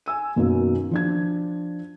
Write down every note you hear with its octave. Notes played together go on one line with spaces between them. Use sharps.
G#5 E6 D#7
F#2 B2 D#3 A#3
F3 D4 G#6